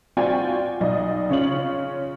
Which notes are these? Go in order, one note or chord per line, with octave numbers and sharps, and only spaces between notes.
C4 F4 F#4 D5 G5 G#5
B1 D#4 D5 D#5
C#3 C#4 F4 F#7